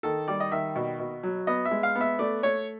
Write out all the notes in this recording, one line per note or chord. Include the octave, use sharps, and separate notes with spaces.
D#3 A4
G3 D5
D#5
D#3 E5
B2
B2
F#3
B3 D#5
E5
G#3
F5
B3
E5
A3 D5
A3 C#5